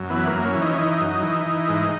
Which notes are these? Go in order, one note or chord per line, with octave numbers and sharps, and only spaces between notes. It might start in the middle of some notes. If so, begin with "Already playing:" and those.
Already playing: F#2
E3 B3
A#3
F#2
C#4
E3
D#4
C#4
E3 D#4
F#2
E3
E3
G#2